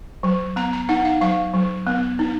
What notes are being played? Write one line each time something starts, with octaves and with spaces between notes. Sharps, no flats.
F#3
B3 A#5
A#5
D#4 F#5
F5
F#3 F5
F#3
B3
D#4